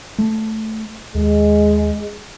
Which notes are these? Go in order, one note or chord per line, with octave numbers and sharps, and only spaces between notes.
A3
D#2 G#3